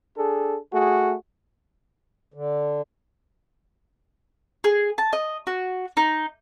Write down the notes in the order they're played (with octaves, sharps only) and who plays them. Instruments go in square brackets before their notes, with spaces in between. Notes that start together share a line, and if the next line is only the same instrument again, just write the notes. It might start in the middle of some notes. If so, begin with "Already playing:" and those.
[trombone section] D4 G#4 A4
A3 F#4 G#4
[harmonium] D3
[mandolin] G#4
A5
D#5
F#4
D#4